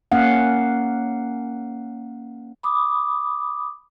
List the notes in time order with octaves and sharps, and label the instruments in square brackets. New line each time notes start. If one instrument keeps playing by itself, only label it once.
[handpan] A#3 C#4 F5 F#5
[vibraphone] B5 D6 D#6